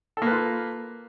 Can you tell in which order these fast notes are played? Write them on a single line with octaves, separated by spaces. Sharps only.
A4 A#3 B4 F4